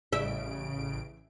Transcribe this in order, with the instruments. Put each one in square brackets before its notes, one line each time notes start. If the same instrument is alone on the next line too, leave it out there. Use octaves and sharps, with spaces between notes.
[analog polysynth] A1 C#3 D7 [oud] E5